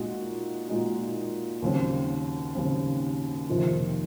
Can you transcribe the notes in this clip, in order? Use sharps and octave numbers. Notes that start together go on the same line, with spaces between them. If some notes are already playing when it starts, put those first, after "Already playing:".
Already playing: A#2 G#3 D#4 F#4
A#2 G#3 D#4 F#4
D#2 C#3 F#3 C4
D#2 C#3 F#3 C4
F2 C3 D#3 A#3 F4